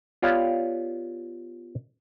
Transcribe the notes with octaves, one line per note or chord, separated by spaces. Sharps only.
B3 F4 G4 C#5 D5 F5